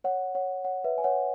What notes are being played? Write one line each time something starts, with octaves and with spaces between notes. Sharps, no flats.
C#5 F#5
C#5 F#5
C#5 F#5
B4 E5
G#5
C#5 F#5